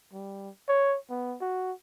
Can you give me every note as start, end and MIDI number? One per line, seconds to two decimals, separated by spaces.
0.13 0.50 55
0.69 0.97 73
1.10 1.36 59
1.41 1.72 66